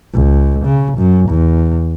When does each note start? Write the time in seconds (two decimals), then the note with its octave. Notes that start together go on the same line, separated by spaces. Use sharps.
0.13 C#2
0.65 C#3
0.98 F#2
1.29 E2